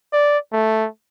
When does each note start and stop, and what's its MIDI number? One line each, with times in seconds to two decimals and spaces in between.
0.13 0.38 74
0.53 0.87 57